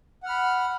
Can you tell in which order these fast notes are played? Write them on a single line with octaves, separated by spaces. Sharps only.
F#5 F6 B5